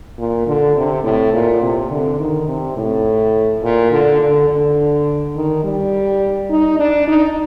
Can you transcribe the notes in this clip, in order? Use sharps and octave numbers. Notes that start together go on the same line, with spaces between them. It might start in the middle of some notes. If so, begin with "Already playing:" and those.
A#2
D3
C3
A2
A#2
C3
D3
D#3
C3
A2
A#2
D3
D3
D3
D#3
G3
D#4
D4
D#4